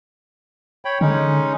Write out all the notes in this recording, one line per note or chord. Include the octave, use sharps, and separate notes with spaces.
C#5 G5 B5
D3 G#3 C#4 D#4